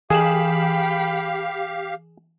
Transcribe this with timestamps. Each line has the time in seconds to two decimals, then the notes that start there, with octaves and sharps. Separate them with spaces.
0.10 E3 G4 G#4 F5 G5 B5 E7 F#7